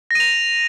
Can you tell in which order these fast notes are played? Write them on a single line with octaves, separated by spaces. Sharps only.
A#6 D#7 F7